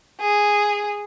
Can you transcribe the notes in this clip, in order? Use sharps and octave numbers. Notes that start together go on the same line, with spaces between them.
G#4